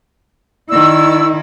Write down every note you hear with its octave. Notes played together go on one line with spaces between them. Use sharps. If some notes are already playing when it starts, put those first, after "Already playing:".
D#3 E4 D5 C#6 E6